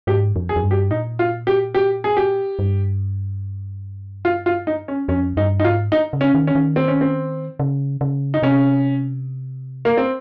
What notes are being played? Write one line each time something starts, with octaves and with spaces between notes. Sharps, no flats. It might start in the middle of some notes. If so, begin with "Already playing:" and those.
G#2 G4
F2
G#4
F2
G2
G4
A#2 D#4
F4
G4
G4
G#4
G4
G2
F4
F4
D#4
C#4
F2 C#4
G2 D#4
D#4
G#2 F4
D#4
C#3
C#4
D#3
C#4
D#3
C4
C#4
C4
C#3
C#3
D#4
C3 C#4
A#3
C4